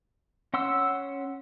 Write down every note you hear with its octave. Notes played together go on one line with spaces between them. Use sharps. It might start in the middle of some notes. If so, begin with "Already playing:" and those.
C#4 F#5 C6 E6